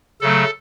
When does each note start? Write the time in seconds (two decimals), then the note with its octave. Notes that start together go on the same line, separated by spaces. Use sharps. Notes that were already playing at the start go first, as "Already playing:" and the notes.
0.21 C#3 F#3 A3 A4